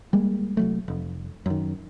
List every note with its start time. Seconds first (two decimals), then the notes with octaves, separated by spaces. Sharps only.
0.13 G3 G#3 A#3
0.57 C2 F#3 A3
0.88 F1
1.46 F#2 D#3